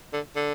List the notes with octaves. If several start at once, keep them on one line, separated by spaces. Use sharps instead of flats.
D3
D3